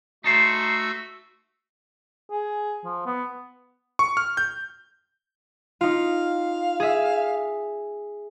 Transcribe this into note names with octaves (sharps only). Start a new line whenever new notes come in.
A3 D#4 F#4 A4 C5 E6
G#4
F3
B3
C#6
F6
G6
D#4 F4 F5
G#4 E5